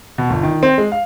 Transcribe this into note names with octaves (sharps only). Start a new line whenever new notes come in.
B2
G1
D#3
C4
G#3
F5